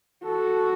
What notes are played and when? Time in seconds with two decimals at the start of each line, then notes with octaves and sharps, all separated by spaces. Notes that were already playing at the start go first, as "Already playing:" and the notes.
0.25 F#4 A4